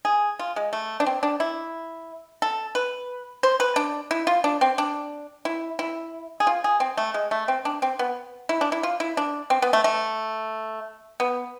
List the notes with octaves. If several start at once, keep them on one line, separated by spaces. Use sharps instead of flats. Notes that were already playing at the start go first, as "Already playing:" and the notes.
G#4
F4
G#3
A3
D4
C4
D4
E4
A4
B4
C5
B4
D4
E4
F4
D4
C4
D4
E4
E4
G#4
F4
G#4
C4
A3
G#3
A3
C4
D4
C4
B3
E4
D4
E4
F4
E4
D4
C4
B3
A3
A3
B3